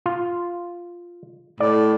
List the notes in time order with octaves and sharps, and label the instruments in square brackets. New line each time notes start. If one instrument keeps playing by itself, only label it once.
[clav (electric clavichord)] F4
[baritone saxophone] A2 [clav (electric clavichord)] D5